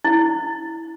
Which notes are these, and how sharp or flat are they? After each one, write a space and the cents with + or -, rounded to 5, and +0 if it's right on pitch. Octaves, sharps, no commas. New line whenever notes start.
E4 -10